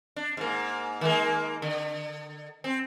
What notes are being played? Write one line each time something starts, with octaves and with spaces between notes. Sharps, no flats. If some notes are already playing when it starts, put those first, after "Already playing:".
D4
G#2 A#3
D#3 G#3 A#3
D3
C4